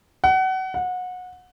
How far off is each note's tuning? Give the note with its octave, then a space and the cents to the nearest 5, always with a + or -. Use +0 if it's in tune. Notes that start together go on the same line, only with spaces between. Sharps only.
F#5 +30
F#5 -25